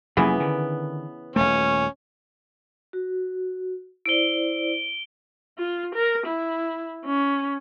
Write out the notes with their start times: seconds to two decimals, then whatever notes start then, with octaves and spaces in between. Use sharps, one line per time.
0.17 F1 C#3 E3 F#3 A#3 B3
0.40 D3 D#3
1.36 D#1 G#1 A3 C#4
2.93 F#4
4.06 E4 C5 D5 D7 G7
5.58 F4
5.95 A#4
6.26 E4
7.05 C#4